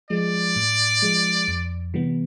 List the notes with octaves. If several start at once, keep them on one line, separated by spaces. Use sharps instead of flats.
F3 G#3 D5
A2
F3 G#3
F2
C3 E3 G3 B3